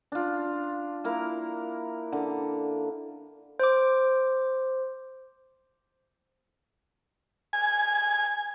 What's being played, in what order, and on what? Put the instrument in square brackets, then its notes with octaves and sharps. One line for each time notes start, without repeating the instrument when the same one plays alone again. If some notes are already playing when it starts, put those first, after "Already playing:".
[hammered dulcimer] D4 F4
A#3 E4 A#4
D3
[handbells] C5 D6
[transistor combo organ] G#5